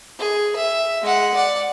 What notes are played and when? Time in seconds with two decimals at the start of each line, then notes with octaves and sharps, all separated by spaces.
0.19 G#4
0.56 E5
1.02 G#3 F#5
1.34 D5 F#5